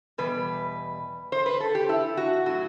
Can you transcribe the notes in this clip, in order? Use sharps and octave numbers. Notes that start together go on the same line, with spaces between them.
E2 B2 G3 B4
C5
B4
A4
G4
E4
F#4
A2 F#3 F#4